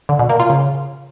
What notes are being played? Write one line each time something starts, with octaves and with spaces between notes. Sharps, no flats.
D3
B2
A#3
F4
C#3